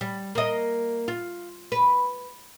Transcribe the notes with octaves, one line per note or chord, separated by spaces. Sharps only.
G3
A#3 D#5
F4
B4